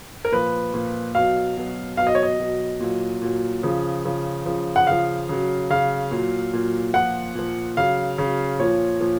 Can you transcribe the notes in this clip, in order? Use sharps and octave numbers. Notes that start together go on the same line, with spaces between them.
A#4
A#2 F3 B4
A#2 F3
B2 F#3 F5
B2 F#3
B2 F#3 F5
D#5
C#5
D#5
B2 F#3
A#2 F#3
A#2 F#3
C#3 F3
C#3 F3
C#3 F3
F#5
C#3 F3 F5
C#3 F#3
C#3 F#3 F5
A#2 F#3
A#2 F#3
A#2 F3 F#5
A#2 F3
C#3 F#3 F5
C#3 F#3
A#2 F3 C#5
A#2 F3